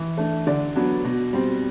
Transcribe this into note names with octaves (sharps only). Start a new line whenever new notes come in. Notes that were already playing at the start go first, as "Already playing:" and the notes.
Already playing: E3
A3 D4
D3 D5
F#3 B3 D4
B2
G3 C4